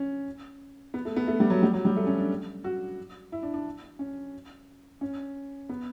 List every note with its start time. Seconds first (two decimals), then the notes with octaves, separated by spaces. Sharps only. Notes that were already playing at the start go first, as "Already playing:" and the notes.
Already playing: C#4
0.94 B3
1.05 A3
1.16 B3
1.28 A3
1.40 G3
1.50 F#3
1.63 G3
1.74 F#3
1.85 G3
1.96 A3
2.07 C#4
2.19 D4
2.64 F#4
3.32 E4
3.43 D4
3.54 D4
3.99 C#4
5.01 C#4
5.69 B3